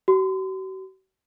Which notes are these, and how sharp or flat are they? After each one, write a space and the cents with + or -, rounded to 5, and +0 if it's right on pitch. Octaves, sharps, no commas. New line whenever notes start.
F#4 +45 C6 -40